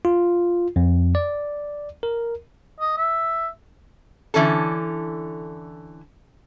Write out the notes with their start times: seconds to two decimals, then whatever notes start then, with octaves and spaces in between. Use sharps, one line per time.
0.05 F4
0.76 F2
1.15 D5
2.03 A#4
2.80 D#5
2.97 E5
4.34 D3 E3 C#4 A4